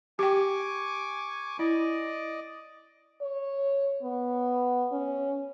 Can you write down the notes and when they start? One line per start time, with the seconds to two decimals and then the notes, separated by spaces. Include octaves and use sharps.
0.19 G4 G5 G#5 C#6 D6
1.59 E4 D5 D#5
3.22 C#5
4.03 B3
4.92 C#4